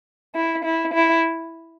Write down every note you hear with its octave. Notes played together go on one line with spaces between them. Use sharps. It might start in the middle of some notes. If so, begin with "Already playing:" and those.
E4
E4
E4